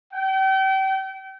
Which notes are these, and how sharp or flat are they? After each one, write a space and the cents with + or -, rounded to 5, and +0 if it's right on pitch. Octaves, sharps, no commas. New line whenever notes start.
G5 -35